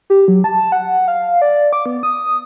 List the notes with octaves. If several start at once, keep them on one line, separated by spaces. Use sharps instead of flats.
G4
F#3
A5
F#5
F5
D5
D6
B3
D#6